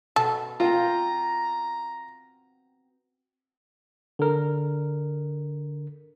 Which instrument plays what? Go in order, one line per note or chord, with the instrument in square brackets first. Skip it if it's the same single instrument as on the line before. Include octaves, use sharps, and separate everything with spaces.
[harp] B2 [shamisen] A4
[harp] C4 G5 [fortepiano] F4 [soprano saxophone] A#5
[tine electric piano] D3 A#4